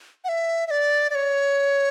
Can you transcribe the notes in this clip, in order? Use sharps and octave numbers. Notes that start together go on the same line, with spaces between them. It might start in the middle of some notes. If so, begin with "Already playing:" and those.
F#5
E5
E5
D5
D5
C#5